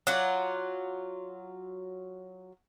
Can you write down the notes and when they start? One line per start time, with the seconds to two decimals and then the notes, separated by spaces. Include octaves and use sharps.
0.07 F#3 F4 D5 F#5